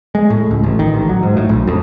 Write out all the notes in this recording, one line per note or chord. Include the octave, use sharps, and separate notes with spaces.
G#3
A2
C#2
A1
D#3
A1
F#3
G#2
A2
A#1
F2